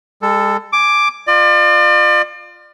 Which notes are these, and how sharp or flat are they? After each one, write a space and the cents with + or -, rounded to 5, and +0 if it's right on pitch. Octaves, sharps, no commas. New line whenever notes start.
G#3 -40 A4 +5
G#5 +0 D6 +5
F4 +0 D5 +40